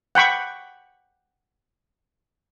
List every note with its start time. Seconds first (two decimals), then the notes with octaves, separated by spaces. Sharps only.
0.15 F#5 G5 B5 C#6